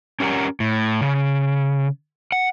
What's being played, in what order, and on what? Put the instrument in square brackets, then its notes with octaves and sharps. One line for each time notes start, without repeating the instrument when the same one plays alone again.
[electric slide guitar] C#4 G4 A#4 F#5 A#5
A2
C#3
F#5